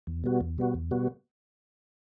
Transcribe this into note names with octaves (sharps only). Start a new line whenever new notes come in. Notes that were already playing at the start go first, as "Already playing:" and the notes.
E2
B2 G3 B3 F#4
E2
B2 G3 B3 F#4
E2
B2 G3 B3 F#4